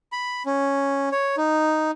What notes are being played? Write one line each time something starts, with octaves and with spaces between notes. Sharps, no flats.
B5
C#4
C#5
D#4